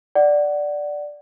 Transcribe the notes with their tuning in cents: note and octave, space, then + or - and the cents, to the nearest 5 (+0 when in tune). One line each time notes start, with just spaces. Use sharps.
D5 +0 F#5 +15